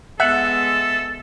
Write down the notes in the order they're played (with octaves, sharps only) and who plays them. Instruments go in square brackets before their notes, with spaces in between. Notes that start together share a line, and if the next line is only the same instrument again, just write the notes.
[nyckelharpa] G#3 B3 [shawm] A4 [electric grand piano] E5 [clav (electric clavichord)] F#5